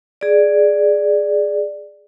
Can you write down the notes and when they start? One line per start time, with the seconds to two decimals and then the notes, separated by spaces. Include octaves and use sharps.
0.21 G#4 D5